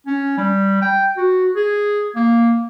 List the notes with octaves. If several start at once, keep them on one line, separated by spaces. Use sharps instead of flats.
C#4
G3
G5
F#4
G#4
A#3